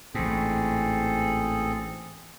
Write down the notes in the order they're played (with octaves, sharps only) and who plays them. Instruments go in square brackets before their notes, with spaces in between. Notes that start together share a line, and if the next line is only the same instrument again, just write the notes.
[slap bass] A1 G#2 [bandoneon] C4 G#4 A4